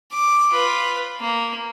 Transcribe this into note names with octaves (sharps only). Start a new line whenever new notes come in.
D6
F4 B4
A#3